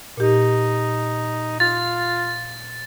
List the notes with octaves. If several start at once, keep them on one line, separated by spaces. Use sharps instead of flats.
A#2 D#4 G4
F4 A6